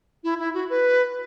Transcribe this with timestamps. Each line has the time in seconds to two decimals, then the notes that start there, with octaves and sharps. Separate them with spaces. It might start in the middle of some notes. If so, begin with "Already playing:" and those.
0.24 E4
0.39 E4
0.54 F#4
0.70 B4